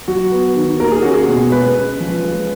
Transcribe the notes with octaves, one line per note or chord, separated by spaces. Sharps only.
F#3 F#4
B3
D#3
A#3 A#4
G#4
C#4 F#4
G#4
B2
G#3 B4
C#4
F3
G#3